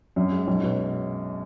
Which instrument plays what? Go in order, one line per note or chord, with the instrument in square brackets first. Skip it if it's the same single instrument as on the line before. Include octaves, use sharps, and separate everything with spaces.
[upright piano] F#2
G#3
B1
B2